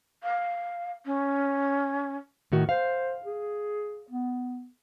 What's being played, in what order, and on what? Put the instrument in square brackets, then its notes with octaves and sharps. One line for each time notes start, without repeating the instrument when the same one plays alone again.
[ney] F5
C#4
[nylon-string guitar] A2 D#3 F#4
[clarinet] C5 [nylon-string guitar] F5
[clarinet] G#4
B3